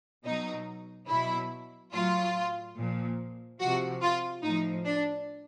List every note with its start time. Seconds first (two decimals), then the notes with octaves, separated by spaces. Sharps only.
0.24 B2 F#3 D#4
1.08 B2 F#3 E4
1.92 A2 F#3 F4
2.76 A#2 F3
3.60 C3 F3 F#4
4.02 F4
4.43 A2 F3 D#4
4.85 D4